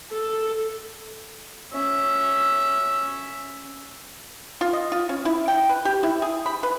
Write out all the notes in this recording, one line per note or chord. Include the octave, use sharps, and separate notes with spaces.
A4
C#4 E5
F4
D#5
F4
C#4
E4
G5
B4
G4
E4
G#4
B5
B4